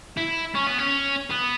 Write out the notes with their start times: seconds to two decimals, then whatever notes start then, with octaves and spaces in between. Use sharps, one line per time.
0.17 E4
0.55 C#4
0.67 B3
0.78 C#4
1.30 B3